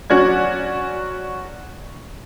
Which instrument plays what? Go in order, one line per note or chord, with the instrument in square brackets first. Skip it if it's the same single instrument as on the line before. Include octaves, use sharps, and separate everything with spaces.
[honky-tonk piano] F#3 C#4 F#4 D5 G#6